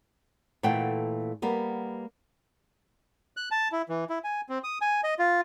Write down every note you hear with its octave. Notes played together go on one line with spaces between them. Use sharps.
A#2 E3 A3 A4 F#5 G5
G3 A#3 B3
F#6
A5
E4
E3
E4
G#5
C4
D#6
G#5
D#5
F4